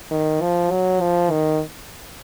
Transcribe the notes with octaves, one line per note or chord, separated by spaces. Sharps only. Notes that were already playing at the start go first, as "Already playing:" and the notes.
D#3
F3
F#3
F3
D#3